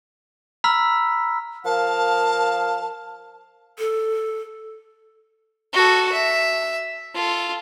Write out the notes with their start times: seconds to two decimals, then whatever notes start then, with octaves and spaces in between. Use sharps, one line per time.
0.64 A#5 B5 E6 F6 B6
1.65 F3 A#4 F5 A5
3.79 A4
5.73 F#4 A4
6.12 E5
7.15 F4 A4